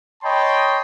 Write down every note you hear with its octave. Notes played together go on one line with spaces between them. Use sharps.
C#5 D#5 G5 A5 B5 C6